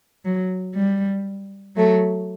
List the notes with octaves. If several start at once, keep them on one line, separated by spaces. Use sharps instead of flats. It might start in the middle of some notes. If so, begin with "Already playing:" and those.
F#3
G3
F#3 A3